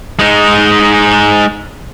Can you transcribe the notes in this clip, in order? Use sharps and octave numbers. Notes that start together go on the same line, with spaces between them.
G#3 D#4